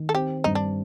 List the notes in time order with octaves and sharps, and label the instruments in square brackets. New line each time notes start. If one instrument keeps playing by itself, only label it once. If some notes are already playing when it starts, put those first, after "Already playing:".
Already playing: [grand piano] D#3
[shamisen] A4
[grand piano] C4 [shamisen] G4
[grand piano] G2 [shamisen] D#4
[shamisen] D4